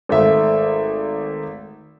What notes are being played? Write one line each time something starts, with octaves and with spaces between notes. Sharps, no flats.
G#1 A3 E5